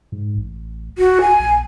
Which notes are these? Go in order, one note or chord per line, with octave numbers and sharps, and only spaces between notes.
G#2
A1
D1 F#4
G#5
A#1